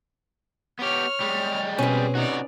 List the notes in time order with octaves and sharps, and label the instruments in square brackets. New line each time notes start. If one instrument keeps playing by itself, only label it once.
[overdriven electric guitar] B3 G4 [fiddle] C#5 F6
[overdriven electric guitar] G3 G#3
[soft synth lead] B2 [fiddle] C4 G#4 [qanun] C#4 B4
[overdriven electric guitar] C3 F#4 [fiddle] D#4 D5